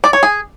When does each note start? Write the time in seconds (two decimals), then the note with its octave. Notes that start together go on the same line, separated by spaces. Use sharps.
0.04 D5
0.13 C#5
0.23 G#4